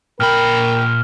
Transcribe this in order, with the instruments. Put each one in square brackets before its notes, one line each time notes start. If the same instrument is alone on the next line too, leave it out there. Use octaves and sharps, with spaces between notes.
[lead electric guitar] A#2 B5 [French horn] A#4 [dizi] G5 [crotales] F6